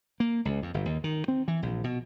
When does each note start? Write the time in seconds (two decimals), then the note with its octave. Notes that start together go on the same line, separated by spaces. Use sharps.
0.20 A#3
0.45 C#2
0.62 F2
0.74 G1
0.86 D#2
1.04 D#3
1.28 C4
1.48 E3
1.62 A#1
1.84 B2